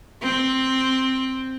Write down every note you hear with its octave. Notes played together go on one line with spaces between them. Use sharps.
C4